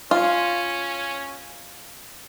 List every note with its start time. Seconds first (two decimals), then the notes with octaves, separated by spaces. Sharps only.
0.11 C#4 F4